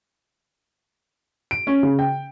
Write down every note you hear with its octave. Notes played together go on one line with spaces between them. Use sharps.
D7
C#4
C#3
G5